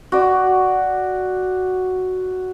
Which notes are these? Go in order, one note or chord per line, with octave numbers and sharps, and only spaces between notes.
F#4 D5